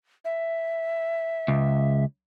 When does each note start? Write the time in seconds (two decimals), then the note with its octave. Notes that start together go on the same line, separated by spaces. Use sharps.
0.25 E5
1.48 C#2